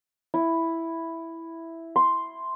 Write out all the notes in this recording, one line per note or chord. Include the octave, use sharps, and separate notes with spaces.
E4
C6